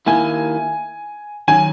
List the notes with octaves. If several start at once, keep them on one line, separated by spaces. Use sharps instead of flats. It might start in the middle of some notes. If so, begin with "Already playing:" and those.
D#3 A#3 E4 G#5
D#3 F#3 C#4 G#5